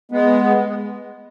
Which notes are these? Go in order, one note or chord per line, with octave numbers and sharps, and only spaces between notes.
G#3 B3